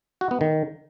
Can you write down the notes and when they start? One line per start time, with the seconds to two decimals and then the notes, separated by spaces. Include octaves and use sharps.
0.21 F#4
0.31 B3
0.41 D#3